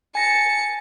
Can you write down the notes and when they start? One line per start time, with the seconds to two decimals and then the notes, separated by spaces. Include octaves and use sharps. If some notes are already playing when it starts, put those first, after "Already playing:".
0.15 G#5 A5 A#6 C#7